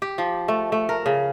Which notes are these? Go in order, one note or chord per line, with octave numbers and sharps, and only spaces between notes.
G4
F3
A3
A3
A#4
C#3